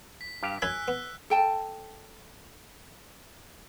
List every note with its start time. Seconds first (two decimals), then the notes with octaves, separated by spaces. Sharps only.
0.21 B6
0.43 G2 G4 F5
0.62 F#2 E5 G#5 B5 E6 F#6
0.88 B3
1.30 A4 G5 A5